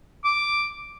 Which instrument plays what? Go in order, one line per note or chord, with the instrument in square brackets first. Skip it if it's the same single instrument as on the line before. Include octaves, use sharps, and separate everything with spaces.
[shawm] D6